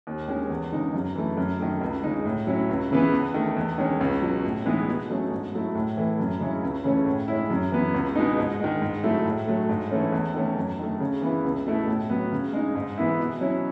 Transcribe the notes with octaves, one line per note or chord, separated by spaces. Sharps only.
D#2
D#3 G#3 C#4
E2
C#3 G#3 D#4
F#2
E3 A3
F#2
D#3 A3
C#2
C#3 G#3 D#4
A2
F#3 C#4 E4
C#2
C#3 E3 B3
E2
D#3 A3
E2
D#3 G#3 C#4
C#2
B2 F#3
A2
E3 G#3 B3 D#4
B2
F#3 A3 C#4
G#2
F#3 A3 E4
A2
E3 A3
F#2
C#3 G#3 C#4 E4
C#2
C#3 E3 A3 C#4
A2
G#3 C#4 E4
F#2
E3 B3
C#2
B2 G#3 B3 D#4
G#2
D#3 G#3
G#2
F#3 A3 E4
A2
F#3 A3
G#2
E3 A3 C#4
E2
D#3 A3 C#4
F#2
D#3 A3
C#3
E3 B3 E4
C#2
B2 A3 E4
A2
F#3 B3
C#3
G#3 D#4
G#2
E3 B3 E4
B2
F#3 C#4 E4